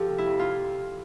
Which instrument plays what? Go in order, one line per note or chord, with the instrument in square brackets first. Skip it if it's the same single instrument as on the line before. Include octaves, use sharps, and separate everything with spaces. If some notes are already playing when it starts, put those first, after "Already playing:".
Already playing: [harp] F3 G4 A4
C3
E4
F2
F4